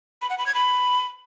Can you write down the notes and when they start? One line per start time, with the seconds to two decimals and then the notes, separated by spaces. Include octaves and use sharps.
0.22 B5
0.30 F#5
0.38 B5
0.46 G#6
0.55 B5